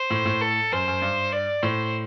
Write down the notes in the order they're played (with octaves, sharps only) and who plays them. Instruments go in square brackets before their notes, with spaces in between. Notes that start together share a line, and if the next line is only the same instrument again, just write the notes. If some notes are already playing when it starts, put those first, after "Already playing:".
Already playing: [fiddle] C5
[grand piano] A2
A2
[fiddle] A4
[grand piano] F#2 [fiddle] C5
[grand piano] F#2
G2
[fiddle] D5
[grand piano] A2 [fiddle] C5